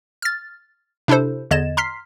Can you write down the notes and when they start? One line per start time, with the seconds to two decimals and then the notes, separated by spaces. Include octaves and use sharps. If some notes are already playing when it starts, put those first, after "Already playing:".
0.22 F6 A6
1.08 C3 D4 E4 A4 C5
1.51 E2 D3 D#5 G#6 A6 E7
1.77 A#5 C6 F6 B6 C7